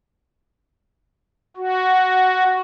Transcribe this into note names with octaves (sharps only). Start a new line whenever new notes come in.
F#4